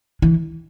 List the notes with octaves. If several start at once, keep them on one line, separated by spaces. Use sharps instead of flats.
E3